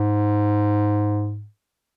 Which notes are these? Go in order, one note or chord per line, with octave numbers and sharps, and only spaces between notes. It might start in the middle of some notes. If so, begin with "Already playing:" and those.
Already playing: G#2